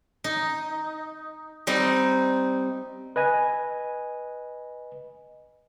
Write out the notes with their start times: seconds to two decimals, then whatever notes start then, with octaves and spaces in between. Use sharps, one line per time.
0.24 D#4
1.67 G3 C4 D#4
3.16 B4 D#5 G#5